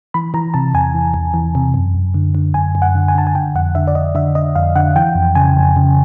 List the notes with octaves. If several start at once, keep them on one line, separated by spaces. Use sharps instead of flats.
E3 B5
E3 A#5
C3 A5
E2 G#5
E3
E2
E3
C3
F#2
F#2
D3
D3
F#2 G#5
F#2
F#5
D3
G#5
D3 A5
G#5
D3 G5
F2 F#5
D3 E5
D5
F2 D#5
D3 E5
D3 D#5
F2 F5
D3 F#5
E3 G5
F2
C#3 G#5
F2
C#3